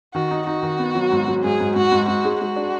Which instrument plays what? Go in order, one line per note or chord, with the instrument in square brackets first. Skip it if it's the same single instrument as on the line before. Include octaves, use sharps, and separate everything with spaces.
[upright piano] D#3 [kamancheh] F#4
[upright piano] D#4
[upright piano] D#4 [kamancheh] F#4
[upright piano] D#3
B3
F#3
G#2
F#3
[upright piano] G#2 [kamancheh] G#4
[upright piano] G#2
[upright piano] G#2 [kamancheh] F#4
[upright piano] G#2
[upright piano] G#2 [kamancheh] F#4
[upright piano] G#3
[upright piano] G#3 [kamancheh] F#4
[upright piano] D4